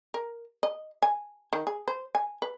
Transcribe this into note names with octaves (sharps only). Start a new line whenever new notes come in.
A#4
D#5
G#5
D#3
G#4
C5
G#5
B4